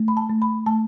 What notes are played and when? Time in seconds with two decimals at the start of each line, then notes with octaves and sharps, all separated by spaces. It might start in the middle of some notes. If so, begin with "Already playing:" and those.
Already playing: A3
0.08 B5
0.17 A5
0.29 A3
0.42 B5
0.66 A3 A5